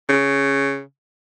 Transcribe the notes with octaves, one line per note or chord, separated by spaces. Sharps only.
C#3